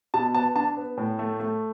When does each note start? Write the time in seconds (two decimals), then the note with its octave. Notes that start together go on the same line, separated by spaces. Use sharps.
0.14 B2 A5
0.35 B3 A5
0.56 D4 A5
0.77 B3
0.97 A2
1.19 A3
1.40 A3